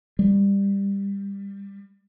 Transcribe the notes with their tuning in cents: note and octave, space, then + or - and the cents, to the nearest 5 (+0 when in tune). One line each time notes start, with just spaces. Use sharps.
G3 +20